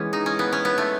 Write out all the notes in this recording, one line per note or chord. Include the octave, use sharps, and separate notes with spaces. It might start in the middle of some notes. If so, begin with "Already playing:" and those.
Already playing: E3 G#3 B3 C#4
D#4
C#4
B3
C#4
B3
A3